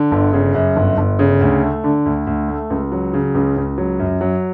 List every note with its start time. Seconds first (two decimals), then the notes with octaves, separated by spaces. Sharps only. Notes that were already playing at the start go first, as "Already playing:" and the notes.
Already playing: D3
0.12 G1
0.33 C#3
0.54 F#2
0.76 G1
0.98 G1
1.19 C#3
1.41 D2
1.62 A3
1.84 D3
2.06 D2
2.27 D2
2.48 A3
2.70 C#2
2.92 F#3
3.13 C#3
3.35 C#2
3.56 C#2
3.78 F#3
3.99 F#2
4.21 F#3